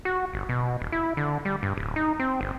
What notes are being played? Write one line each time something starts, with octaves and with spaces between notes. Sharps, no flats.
F#4
G1
B2
D#1
E4
D3
G3
G2
D1
D#4
C4
G1